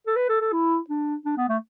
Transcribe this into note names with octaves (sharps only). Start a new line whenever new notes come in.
A4
B4
A4
A4
E4
D4
D4
B3
A3